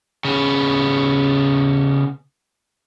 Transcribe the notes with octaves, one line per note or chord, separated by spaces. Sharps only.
C#3 B3